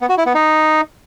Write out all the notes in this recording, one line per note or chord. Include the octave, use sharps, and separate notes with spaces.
B3
F#4
E4
B3
D#4